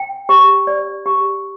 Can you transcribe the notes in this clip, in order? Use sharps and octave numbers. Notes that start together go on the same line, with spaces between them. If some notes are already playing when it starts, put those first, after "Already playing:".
Already playing: G5
G4
D5
G4